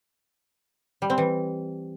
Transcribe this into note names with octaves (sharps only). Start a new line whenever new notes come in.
G3
C4
E3